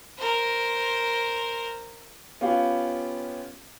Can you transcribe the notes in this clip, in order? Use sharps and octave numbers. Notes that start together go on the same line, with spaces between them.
A#4 C5
B3 C#4 F4 G4 F5